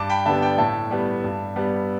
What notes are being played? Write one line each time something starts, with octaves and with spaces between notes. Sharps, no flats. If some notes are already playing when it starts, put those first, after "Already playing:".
Already playing: G2 A5 D6
G5 B5
D3 G3 B3 E5 A5
D5 G5
A2 E5 A5
G3 B3
G2
G3 B3